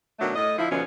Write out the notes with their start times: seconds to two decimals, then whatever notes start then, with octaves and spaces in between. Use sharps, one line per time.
0.20 B2 D#3 F#3 A3 D4
0.35 A2 D#5
0.57 D3 F3 E4
0.70 D#2 B2 D3 F3 C#4